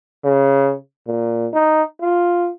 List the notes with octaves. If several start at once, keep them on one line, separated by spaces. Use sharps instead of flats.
C#3
A#2
D#4
F4